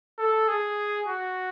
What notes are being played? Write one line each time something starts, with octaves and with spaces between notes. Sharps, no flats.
A4
G#4
F#4